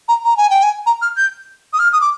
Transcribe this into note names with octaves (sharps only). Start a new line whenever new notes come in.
A#5
A#5
G#5
G5
G#5
A#5
F6
G6
D#6
F6
D#6
D6